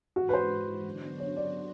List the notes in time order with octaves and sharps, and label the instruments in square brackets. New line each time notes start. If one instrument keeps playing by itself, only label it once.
[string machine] G#2 E3 G#3 [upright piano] F#4
[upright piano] B4
C5
[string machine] D3 F#3 B3 D4 F#4
[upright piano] C#5
D5